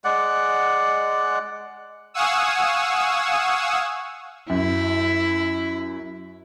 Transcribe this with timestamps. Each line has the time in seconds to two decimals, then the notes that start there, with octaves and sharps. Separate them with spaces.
0.04 G#3 D5 F#5
2.14 F5 F#5 G#5 C#6 D#6 E6
4.50 F#2 E4